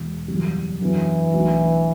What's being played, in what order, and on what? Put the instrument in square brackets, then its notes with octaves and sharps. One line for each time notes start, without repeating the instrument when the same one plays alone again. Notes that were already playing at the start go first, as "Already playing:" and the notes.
Already playing: [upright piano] E1 E2 B2
F#1 E2 B2 G3
[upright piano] F#2 D3 F#3 B3 [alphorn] E3
[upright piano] B1 B2 A3 D4